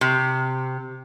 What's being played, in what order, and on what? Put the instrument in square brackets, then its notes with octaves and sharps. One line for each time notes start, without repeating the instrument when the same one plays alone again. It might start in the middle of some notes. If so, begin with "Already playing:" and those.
[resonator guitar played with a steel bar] C3